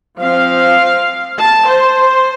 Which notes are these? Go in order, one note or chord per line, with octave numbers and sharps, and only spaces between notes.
F3 C4 F5
A5
C5